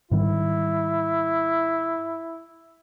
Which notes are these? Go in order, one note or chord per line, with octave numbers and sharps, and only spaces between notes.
G#2 D#3 G3 E4